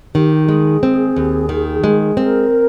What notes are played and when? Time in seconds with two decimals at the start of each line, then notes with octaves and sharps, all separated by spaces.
0.15 D#3 G4
0.48 G#3 G#4
0.83 C4
1.16 D#2
1.49 D#3
1.84 G#3
2.17 C4 A#4